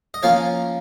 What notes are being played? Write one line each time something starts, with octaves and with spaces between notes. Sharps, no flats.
D#5
F3 A#3 C#4 C#5 F5